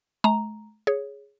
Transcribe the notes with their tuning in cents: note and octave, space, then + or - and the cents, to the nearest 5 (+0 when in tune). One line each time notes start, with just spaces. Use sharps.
A3 -45 A#5 +0
G#4 +0 C#5 +0